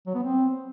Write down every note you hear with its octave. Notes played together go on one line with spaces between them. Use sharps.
F#3
B3
C4